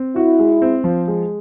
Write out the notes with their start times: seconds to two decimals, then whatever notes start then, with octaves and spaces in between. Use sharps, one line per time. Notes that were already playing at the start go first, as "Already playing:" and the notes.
Already playing: C4
0.15 E4 F#4
0.39 G#3
0.62 C4
0.84 F3
1.08 G#3